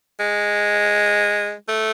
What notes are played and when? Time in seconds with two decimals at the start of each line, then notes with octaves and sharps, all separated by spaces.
0.20 G#3
1.68 A3